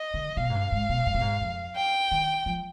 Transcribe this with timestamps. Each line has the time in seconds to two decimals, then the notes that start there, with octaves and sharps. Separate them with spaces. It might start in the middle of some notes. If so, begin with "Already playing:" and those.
Already playing: D#5
0.14 D3
0.37 B2 F5
0.50 G#2
0.55 G2
0.72 G#2
0.89 B2
1.06 G#2
1.14 B2
1.21 G#2
1.41 F2
1.76 G5
2.11 D#3
2.46 F3